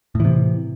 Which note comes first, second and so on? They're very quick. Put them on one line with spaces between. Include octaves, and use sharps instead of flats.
A2 E3 C3